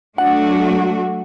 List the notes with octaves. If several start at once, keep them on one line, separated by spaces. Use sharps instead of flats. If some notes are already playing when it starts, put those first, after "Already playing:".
F#3 A3 D4 F#4 F#5